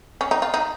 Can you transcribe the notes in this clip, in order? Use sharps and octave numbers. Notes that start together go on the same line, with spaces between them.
C#4
D#4
F4
D#4